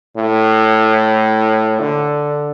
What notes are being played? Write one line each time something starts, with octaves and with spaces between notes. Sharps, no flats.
A2
D3